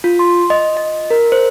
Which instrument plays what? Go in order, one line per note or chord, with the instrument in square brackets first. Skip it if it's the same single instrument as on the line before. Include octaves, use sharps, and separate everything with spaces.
[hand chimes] F4
C6
D#5
D#5
A#4
C5